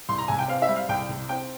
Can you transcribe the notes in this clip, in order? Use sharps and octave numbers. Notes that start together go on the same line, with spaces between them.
C2 C6
A#5
C3 G#5
G5
C4 F5
E5
G3
F5
C2 G5
C3
C4 G5